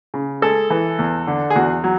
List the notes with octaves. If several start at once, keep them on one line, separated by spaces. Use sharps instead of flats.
C#3
G#3 A4
E3
E2
D3
G#4
E2 F#4
F#3